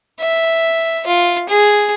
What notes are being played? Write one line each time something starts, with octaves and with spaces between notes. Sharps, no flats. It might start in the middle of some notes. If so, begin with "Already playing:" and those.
E5
F4
G#4